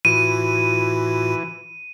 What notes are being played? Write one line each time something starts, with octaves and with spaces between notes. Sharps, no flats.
A2 E3 F4 F#4 D#7